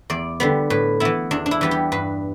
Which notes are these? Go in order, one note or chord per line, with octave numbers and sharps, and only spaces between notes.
E2 D5
D3 G3 B3
A2 B4
E3 B3 E4
E2 D4
D4
E4
E3 G3 B3
G4
G2 B4